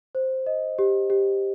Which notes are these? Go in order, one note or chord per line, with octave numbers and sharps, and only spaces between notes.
C5
D#5
G4
G4